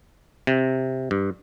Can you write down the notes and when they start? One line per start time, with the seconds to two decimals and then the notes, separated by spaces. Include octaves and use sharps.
0.47 C3
1.11 G2